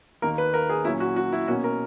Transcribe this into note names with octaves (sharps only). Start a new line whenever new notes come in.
D#2 D#3 A#3 A#4
B4
A#4
G#4
A#2 F#3 C#4 E4
F#4
F#4
E4
B2 A#3 C#4 F#4
A#4